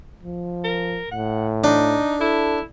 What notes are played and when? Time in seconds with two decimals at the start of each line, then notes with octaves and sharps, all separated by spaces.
0.23 F3
0.64 A#4
1.11 A2 F#5
1.64 D4 D#4
2.21 E4 A4